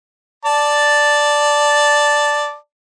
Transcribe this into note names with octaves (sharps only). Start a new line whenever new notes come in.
D5 A5